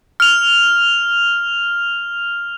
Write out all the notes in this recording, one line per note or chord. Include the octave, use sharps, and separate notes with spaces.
F6 F7